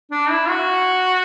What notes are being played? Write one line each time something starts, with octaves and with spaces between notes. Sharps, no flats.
D4
E4
F#4